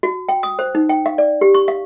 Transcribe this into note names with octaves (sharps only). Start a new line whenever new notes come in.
F#4
G5
D#6
C5
D#4
G5
F5
D5
G4
C#6
F5